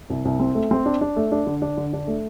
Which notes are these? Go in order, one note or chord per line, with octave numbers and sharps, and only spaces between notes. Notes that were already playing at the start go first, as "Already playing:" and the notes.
C2
C2
C4
A3
C4
D4
D4
A3
D4
D3
D4
D3
D4
A3